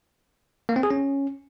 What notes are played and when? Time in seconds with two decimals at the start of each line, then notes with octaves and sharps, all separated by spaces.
0.69 A#3
0.76 C4
0.83 G#4
0.91 C#4